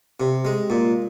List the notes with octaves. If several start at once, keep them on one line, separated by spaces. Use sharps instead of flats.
C3
G#3
A#2